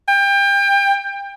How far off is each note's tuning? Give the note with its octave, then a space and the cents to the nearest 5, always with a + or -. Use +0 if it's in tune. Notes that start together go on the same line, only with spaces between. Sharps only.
G5 +25